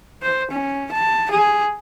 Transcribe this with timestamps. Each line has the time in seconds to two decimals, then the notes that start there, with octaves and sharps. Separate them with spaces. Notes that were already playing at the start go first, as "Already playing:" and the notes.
0.22 C5
0.51 C#4
0.92 A5
1.31 G#4